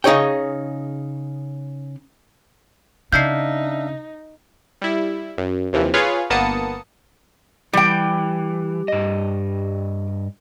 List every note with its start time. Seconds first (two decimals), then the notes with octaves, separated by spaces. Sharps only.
0.04 C#3 D#4 G#4 C#5 G5
3.13 C#3 D4 D#4 E5 F5 G6 C7
4.82 G3 E4
5.38 F#2
5.73 D#2 C3 E3 F3
5.94 F4 G#4 B4 C#5 F5
6.30 G1 A#3 B3 A5 D#6 C#7
7.73 E3 G3 G5
8.88 G2 D#5